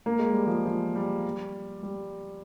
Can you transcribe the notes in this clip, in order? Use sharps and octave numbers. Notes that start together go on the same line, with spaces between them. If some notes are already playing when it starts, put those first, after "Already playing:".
A#3
G#3
G3
F3 G#3
F3
G3
G3